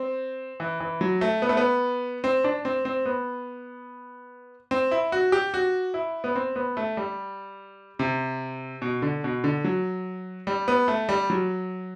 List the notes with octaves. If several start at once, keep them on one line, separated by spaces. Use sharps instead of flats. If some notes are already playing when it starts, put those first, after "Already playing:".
Already playing: C4
E3
E3
F#3
A3
B3
A3
B3
C4
D4
C4
C4
B3
C4
E4
F#4
G4
F#4
E4
B3
C4
B3
A3
G3
C3
B2
D3
B2
D3
F#3
G3
B3
A3
G3
F#3